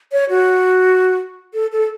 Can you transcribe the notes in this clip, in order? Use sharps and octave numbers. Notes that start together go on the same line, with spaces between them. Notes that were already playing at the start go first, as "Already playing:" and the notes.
C#5
F#4
A4
A4